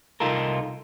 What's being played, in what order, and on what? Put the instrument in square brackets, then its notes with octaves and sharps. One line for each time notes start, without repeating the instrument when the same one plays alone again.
[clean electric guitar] C2 D#4 F4 A4 A#4